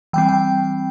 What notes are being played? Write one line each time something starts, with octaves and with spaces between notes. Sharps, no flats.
E3 G3 C4 G5
G5